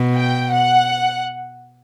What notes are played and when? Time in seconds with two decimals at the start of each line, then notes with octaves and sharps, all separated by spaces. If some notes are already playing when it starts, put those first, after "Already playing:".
Already playing: B2
0.16 G5
0.52 F#5